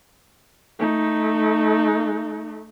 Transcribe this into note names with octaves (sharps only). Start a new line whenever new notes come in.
A3 D#4